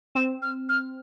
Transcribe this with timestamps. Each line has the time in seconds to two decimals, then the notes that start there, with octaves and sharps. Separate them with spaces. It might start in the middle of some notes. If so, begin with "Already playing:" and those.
0.15 C4 E7
0.42 F6
0.69 F6